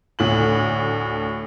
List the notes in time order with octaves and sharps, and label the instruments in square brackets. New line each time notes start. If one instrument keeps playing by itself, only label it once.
[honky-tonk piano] D2 A2 F#7